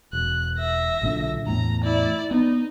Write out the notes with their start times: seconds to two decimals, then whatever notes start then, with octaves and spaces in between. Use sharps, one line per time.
0.13 E1 F#6
0.58 E5 A#6
1.02 B1 A#2 D3
1.47 E2 A2 A#5
1.83 E4 D5
2.31 B3 D#4